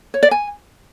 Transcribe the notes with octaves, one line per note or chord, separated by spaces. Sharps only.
C#5
D5
G#5